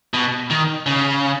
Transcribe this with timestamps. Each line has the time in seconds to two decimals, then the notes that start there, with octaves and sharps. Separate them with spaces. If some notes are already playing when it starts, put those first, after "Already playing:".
0.14 B2
0.50 D#3
0.86 C#3